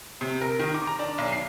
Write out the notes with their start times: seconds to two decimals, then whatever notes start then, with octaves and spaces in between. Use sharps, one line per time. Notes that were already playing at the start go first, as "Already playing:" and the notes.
0.21 C3
0.41 A#4
0.59 D#3
0.74 D6
0.87 A#5
0.99 D4
1.18 B1
1.32 C7